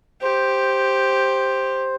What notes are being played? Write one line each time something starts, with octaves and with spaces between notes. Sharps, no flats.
G4 C5